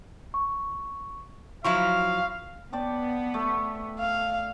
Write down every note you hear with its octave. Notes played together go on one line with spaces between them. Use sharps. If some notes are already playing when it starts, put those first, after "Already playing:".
C#6
F3 F#3 E4 F5 C#6
B3 D5 G5 A5
A3
F5